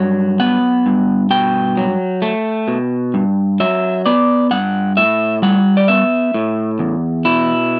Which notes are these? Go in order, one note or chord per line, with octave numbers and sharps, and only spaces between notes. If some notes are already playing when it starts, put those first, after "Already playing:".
Already playing: G2 F#3 F#5
B3 F#5
G2
B2 G5
F#3
A3
B2
G2
F#3 E5
B3 D5
G2 F#5
A2 E5
G3 F#5
D5
B3 E5
A2
E2
B2 E4